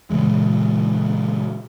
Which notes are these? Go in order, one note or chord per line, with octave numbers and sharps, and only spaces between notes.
A#2 C#3 E3 G#3